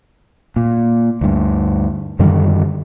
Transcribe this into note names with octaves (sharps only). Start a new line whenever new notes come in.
A#2
D2 G2
F#2 D3 D#3 G3